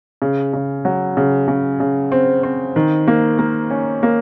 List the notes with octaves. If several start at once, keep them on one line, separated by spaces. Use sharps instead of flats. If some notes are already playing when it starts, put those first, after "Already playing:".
C#3
C#3
F#3
C#3
C#3
C#3
C4
C4
D#3
A#3
A#3
C#4
A#3